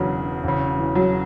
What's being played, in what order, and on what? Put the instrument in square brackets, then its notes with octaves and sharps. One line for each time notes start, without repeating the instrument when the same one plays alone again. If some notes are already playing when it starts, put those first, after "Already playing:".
Already playing: [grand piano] E1 E2 C#3 [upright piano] F#3 D4
[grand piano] E1 E2 C#3
[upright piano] E3
F#3